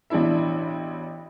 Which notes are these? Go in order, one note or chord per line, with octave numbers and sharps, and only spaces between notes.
A1 B2 D4 E4 E5